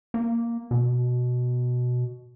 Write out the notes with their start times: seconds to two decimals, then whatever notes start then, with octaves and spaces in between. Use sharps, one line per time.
0.14 A#3
0.71 B2